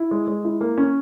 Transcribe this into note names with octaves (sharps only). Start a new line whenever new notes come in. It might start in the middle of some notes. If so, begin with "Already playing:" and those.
Already playing: E4
G#3
G#3
E4
A#3
C#4